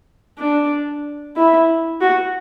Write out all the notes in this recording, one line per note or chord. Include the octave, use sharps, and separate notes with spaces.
D4
E4
F#4